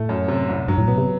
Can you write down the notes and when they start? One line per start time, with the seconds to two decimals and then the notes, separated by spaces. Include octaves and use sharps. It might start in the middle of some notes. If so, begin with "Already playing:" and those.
Already playing: A2 A3
0.09 F#2
0.28 C3
0.49 C2
0.68 G2 F#3
0.78 A2
0.88 B2 B3
0.98 C3